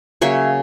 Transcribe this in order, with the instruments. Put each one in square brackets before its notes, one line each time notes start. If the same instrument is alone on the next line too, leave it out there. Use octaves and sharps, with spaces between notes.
[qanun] C#3 F#3 A#3 C#5 E5